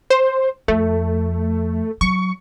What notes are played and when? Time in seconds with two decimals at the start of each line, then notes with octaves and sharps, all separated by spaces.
0.10 C5
0.68 F2 A3
2.01 F#3 C#6